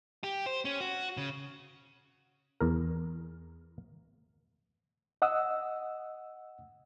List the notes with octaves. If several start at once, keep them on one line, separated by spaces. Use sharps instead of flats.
G4
C5
C#4
F#4
C#3
E2 A#4
D#5 F#5 D#6 E6